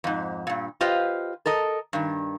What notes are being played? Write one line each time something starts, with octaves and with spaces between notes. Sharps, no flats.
F2 G#2
G2 A#2
F4 G4 B4 C5 D#5 F5
A4 A#4 D#5
G2 D#3